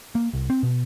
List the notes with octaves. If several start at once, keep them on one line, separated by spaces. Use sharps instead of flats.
A#3
C2
C4
B2